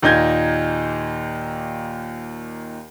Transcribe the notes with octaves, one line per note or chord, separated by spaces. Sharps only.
D#2 A#2 D#4 G6 G#6